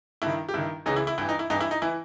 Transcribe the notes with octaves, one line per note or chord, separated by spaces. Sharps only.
G2 D#3 E4
G4
G2 D#3 E4
C#2 C#3 E3 D#4
E4
E4
G2 E3 E4
D#4
E4
G2 E3 D#4
E4
D#4
E3 E4